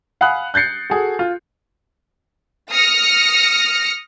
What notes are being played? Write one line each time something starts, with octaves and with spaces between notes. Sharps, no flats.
F5 F#5 G#5 B5 D#6 F#6
F#6 G6 A6 C7 C#7
F#4 G#4 A4
F4
D#6 F6 A#6 C#7